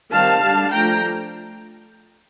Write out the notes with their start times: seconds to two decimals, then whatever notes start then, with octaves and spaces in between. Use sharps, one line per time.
0.12 D#3 G3 C4 F5 A5
0.42 D3 G3 D4
0.71 F3 A3 D4 G5 A#5